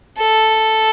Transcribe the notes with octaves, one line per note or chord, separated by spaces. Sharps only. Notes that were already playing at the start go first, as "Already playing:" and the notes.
A4